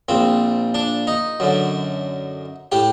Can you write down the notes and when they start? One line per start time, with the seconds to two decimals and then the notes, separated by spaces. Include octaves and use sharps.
0.09 A#1 A#2 C4
0.74 D4
1.07 D#4
1.40 F#2 D3
2.72 A2 G4